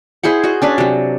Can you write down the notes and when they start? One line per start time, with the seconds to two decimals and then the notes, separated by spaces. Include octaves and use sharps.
0.23 E4 G#4 C5 F#5
0.44 F#4 D#5
0.62 C#4 D4 B4
0.78 C3 F#3